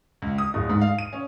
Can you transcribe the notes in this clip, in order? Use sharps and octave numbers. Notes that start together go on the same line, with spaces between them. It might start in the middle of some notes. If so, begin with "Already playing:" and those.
C#2
D#6
D1
G#2
F5
D#7
C#4